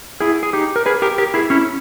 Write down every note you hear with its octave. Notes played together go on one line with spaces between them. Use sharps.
E4 G#4
G#4
D#4 G4
A#4
G#4 B4
G4 A#4
G4 A#4
E4 G#4
C#4 E4